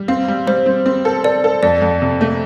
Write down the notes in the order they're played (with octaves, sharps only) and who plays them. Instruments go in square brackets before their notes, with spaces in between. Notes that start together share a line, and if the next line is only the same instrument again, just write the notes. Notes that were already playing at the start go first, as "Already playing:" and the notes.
Already playing: [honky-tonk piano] G3
[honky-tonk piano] C4 [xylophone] F5
[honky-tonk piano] G3
[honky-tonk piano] G3 [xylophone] C5
[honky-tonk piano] C4
C4
A4
[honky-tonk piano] A4 [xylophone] D5
[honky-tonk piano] A4
[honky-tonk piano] F2 [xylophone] D5
[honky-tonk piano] F2
C3
A3